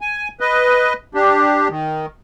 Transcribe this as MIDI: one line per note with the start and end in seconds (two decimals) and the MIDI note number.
0.01 0.28 80
0.40 0.93 71
0.40 0.93 75
1.14 1.68 62
1.14 1.68 67
1.69 2.06 51